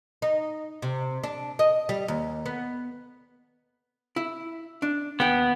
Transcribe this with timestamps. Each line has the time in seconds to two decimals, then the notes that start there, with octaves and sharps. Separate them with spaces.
0.22 D#4
0.82 C3
1.23 D4
1.59 D#5
1.89 G3
2.08 D#2
2.46 B3
4.16 E4
4.82 D4
5.20 D#2 B3 G5